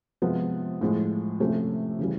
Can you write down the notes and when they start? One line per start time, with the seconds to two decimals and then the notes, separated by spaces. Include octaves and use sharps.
0.22 C3 F3 G#3 B3
0.81 A2 F3 G#3
1.40 C3 F3 A3 C#4
1.99 C#3 E3 G3